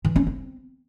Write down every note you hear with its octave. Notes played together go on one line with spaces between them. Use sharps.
E3
C#4
C4